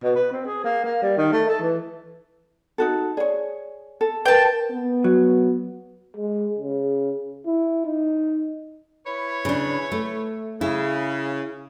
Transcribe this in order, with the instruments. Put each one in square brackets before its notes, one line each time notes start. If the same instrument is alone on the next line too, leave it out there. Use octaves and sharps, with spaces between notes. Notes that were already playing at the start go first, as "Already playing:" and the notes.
[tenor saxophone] B2
B4
C4
G#4
A#3
A#3
G3
D#3
A3
A4
E3
[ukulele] D#4 F#4 A4
[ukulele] G#4 C#5 [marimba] D5
[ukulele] A4
[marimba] A#4 B4 [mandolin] G5 A5
[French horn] B3
[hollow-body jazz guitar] F#3
[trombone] G#3
C#3
E4
D#4
[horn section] E4 B4 C#5
[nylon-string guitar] C#3 D4
A3
[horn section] C#3 [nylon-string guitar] E4